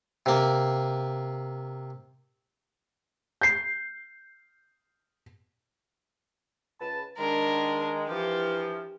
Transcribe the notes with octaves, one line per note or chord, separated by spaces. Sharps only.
C3 A#3
G6 C7
C#2 B4 A5
D#3 G#3 D4 A#4
E3 F3 G4